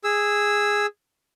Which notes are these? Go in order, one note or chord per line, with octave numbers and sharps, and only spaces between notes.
G#4 E6